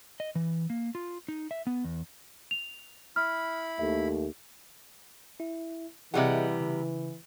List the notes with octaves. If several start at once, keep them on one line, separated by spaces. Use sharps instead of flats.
D#5
E3
A#3
F4
D#4
E5
B3
E2
F7
E4 B5 F6
D#2 A3 E5
E4 E5
C3 E3 G3 G#4 D#5 E5 F#5
C#3